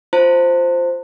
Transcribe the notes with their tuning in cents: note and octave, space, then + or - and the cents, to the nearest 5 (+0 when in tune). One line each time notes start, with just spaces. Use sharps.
F4 +0 C5 +0 A5 +45